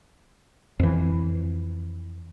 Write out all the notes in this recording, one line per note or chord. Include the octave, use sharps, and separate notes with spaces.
F2 E3